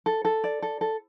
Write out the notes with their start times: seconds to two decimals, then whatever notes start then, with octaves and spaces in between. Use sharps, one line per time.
0.06 A4
0.25 A4
0.44 D5
0.62 A4
0.81 A4